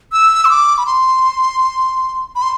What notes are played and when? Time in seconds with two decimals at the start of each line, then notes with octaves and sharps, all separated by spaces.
0.12 E6
0.45 C6
0.50 D6
0.78 B5
0.86 C6
2.35 B5
2.42 C6